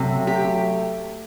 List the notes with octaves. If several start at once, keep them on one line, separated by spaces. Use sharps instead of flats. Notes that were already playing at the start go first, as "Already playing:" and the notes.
Already playing: C3 F#3 A3
G4